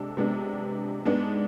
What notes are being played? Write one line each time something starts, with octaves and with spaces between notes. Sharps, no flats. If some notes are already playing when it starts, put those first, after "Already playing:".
Already playing: C3 G#3 D4 A4
C3 G#3 B3 D4
G#2 G#3 B3 D4